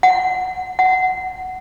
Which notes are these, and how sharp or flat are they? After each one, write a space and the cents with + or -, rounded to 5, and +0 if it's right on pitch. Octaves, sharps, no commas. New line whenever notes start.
F#5 +0
F#5 +10